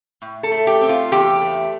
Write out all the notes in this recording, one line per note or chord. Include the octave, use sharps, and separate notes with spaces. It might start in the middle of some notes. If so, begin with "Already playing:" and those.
A2
A4
A3
G4
C4
F4
E2 G4
A3